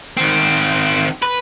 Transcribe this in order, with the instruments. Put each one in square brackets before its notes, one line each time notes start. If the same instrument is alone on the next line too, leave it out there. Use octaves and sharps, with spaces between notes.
[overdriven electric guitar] D#3 C4
B4